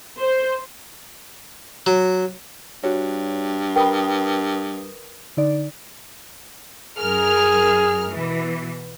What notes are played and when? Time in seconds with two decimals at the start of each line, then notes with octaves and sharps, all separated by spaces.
0.19 C5
1.86 F#3
2.83 G2 F#4 C#5
3.76 A#4 B4 G5 A#5 B5 D#6
5.37 D3 D#4 D5
6.99 F#2 G#4 A#4 F6
8.10 B2 E3